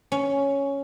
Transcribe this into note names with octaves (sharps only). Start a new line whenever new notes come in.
C#4